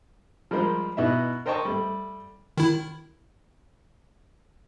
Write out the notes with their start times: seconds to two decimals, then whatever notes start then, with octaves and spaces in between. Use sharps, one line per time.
0.51 F3 G3 G#3 A#4 C5
0.97 B2 D#4 E4 E5
1.46 A#4 C5 D#5 G5 A5 C#6
1.65 G3 A3
2.58 D#3 E4